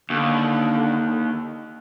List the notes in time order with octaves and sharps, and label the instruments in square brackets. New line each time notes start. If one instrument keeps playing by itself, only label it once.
[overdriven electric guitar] D#2 [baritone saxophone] D3